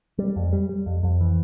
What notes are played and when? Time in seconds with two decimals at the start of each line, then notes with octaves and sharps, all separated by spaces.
0.18 G3
0.36 F2
0.53 G3
0.69 G3
0.86 F2
1.03 F2
1.20 E3